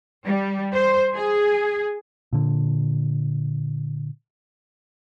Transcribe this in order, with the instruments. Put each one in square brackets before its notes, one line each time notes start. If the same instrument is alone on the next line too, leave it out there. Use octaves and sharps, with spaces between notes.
[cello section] G3
C5
G#4
[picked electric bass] A#2 D3